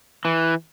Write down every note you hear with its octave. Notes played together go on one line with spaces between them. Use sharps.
E3